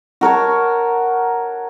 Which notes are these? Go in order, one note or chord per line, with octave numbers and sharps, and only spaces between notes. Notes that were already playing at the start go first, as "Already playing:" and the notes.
F#4 A#4 C#5 A5